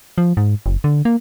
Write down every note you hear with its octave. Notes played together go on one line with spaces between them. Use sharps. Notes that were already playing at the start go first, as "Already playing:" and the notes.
F3
G#2
F#1
D3
A#3